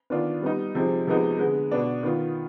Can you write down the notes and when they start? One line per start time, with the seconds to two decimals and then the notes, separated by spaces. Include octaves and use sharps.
0.10 D#3 B3 D4 F4
0.42 G3 B3 D#4
0.75 C3 F3 G#3 C4 D#4
1.07 C3 F3 G#3 B3 D#4
1.39 D3 G#3 B3
1.71 B2 B3 D4
2.03 D#3 B3 F4